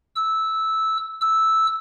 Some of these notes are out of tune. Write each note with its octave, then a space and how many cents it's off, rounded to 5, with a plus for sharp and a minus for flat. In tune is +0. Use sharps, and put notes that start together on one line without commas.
E6 -10
E6 -5